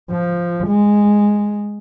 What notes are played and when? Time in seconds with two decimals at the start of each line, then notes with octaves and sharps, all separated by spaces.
0.11 F3
0.67 G#3